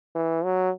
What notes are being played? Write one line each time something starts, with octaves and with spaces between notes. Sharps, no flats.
E3
F#3